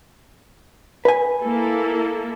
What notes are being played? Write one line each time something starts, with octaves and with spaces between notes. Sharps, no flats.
B4 G#5
A#3 E4 A4